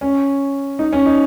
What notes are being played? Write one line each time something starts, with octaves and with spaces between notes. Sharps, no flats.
C#4
D#4
C#4
D#4